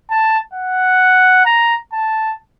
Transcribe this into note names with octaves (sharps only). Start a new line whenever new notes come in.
A5
F#5
A#5
A5